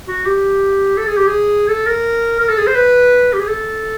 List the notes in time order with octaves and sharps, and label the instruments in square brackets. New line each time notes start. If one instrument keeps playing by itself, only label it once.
[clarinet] F#4
G4
A4
G#4
G4
G#4
A4
A#4
A#4
A4
G#4
C5
B4
G4
G#4
A4